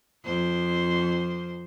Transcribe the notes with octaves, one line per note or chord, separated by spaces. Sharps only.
F2 C5